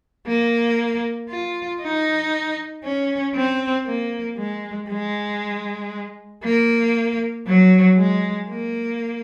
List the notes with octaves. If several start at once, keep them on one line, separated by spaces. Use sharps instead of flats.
A#3
F4
D#4
C#4
C4
A#3
G#3
G#3
A#3
F#3
G#3
A#3